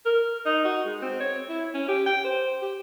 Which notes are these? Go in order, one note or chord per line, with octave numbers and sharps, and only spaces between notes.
A#4
D#4
F#4
G#3
C4
C#5
E4
C#4
G4
G5
C5
G4